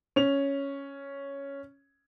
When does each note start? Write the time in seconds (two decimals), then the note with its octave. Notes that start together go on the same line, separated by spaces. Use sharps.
0.16 C#4 F7